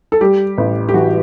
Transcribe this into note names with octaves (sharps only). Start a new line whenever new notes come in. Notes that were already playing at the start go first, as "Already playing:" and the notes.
A4
G3 G4
A1
G4
E3 F#4